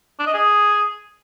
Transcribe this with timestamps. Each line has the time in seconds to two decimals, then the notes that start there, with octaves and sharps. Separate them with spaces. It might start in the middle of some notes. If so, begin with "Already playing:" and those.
0.19 D4
0.27 D#5
0.34 G#4